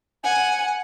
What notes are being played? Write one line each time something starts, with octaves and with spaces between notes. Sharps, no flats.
F#5 G#5